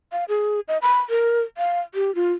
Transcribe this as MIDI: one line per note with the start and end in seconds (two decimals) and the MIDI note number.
0.12 0.24 77
0.29 0.60 68
0.68 0.78 75
0.82 1.00 83
1.10 1.41 70
1.58 1.80 77
1.94 2.14 67
2.15 2.32 65